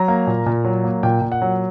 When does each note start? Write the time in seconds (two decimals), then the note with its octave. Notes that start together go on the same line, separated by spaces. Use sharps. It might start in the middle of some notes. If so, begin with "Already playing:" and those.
Already playing: F#3 A#5
0.08 A#3
0.27 A#2
0.46 A#2
0.65 F#3
0.84 A#3
1.03 A#2 G5
1.22 A#2
1.32 F#5
1.42 F#3